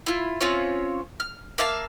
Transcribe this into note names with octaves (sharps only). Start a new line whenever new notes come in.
E4 F4
C4 C#4 F4 C#5
F6
A#3 E5 F5 A5